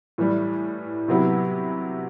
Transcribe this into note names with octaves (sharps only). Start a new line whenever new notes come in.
A2 E3 G3
C3 F#3 B3 E4 G4